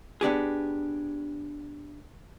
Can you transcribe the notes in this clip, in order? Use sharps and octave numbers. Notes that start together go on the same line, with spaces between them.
B3 D4 G4 G#4